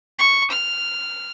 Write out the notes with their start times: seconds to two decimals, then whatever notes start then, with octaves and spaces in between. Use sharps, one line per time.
0.19 C#6
0.51 F6